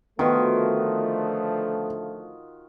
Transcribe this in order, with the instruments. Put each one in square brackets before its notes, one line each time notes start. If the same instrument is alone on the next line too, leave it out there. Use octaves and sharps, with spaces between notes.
[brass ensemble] D3 F3 A3 [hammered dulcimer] D#3 F4 F#4 [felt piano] B3 B4